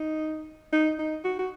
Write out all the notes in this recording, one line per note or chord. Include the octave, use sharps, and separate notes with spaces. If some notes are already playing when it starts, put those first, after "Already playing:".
Already playing: D#4
D#4
D#4
F#4
F#4